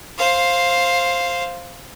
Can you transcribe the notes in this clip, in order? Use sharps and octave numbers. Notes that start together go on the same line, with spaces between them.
C5 F5